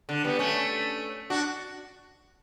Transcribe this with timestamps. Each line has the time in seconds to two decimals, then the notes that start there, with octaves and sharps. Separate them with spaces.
0.09 D3
0.24 G3 B3
0.39 A3 C#4
1.30 D4 F#4